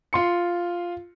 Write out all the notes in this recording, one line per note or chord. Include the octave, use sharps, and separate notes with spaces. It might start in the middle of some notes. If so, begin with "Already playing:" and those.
F4 C6 C#7